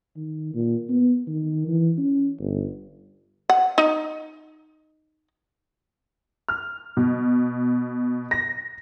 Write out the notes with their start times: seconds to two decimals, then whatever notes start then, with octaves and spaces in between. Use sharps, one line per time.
0.16 D#3
0.54 A#2
0.89 B3
1.27 D#3
1.67 E3
1.98 C#4
2.39 G1
3.49 F#5
3.78 D#4
6.49 F6
6.97 B2
8.31 A#6